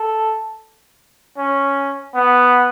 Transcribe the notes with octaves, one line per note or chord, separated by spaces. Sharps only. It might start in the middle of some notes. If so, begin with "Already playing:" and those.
Already playing: A4
C#4
B3